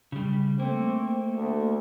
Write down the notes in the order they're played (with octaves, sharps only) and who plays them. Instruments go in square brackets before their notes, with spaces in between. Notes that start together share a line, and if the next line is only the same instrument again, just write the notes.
[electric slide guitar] C#3 G3
[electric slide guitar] A3 A#3 [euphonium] C4
[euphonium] D2